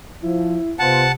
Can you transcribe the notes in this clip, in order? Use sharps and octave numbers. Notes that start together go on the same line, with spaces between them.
F3 E4
C3 B3 F4 C5 F#5 A5